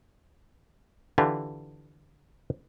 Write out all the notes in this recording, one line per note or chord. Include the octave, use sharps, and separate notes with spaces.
D3 E3 F4 G4